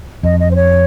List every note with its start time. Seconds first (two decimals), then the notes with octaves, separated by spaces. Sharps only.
0.23 F2 D#5
0.40 D#5
0.51 C5
0.56 C#5